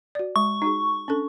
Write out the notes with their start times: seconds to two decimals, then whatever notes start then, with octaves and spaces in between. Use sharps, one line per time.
0.15 F#4 D5
0.36 G#3 C#6
0.62 D#4 F#4 G#4
1.08 C#4 D4 A4